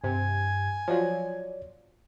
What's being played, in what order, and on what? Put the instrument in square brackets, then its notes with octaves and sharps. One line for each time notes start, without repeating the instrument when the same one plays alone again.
[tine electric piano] G2 [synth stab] C3 [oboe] G#5
[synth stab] F3 F#3 [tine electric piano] C#5 D5